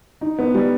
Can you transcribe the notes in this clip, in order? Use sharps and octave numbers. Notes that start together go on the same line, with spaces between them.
D#4
B3
G3